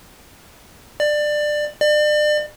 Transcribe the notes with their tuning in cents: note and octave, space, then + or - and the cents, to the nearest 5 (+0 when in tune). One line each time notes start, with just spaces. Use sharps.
D5 +20
D5 +35